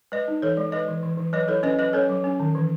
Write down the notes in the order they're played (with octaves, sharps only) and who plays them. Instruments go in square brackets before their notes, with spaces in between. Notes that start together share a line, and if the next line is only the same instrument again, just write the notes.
[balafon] G#3 B4 D#5
D#4
E3 A4 C#5
G#3
G#3 B4 D#5
E3
E3
E3
F#3 B4 D#5
E4 A4 C#5
C#4 B4 D#5
F#3 B4 D#5
C#4 A4 C#5
F#3
C#4
D#3
E3